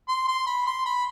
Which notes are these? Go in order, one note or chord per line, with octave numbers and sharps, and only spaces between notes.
C6
C6
B5
C6
B5